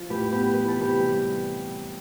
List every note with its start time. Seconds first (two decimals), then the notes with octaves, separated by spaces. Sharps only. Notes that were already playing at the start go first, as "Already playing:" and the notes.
Already playing: F3 F4
0.10 A2 G4 B4
0.32 B3 G4 B4
0.54 E3 B4
0.68 A4
0.77 C3 G4 B4
1.00 G3